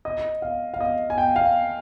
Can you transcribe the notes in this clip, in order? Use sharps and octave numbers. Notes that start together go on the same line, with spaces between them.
D#5
F5
F5
D#5
G#5
G5
F5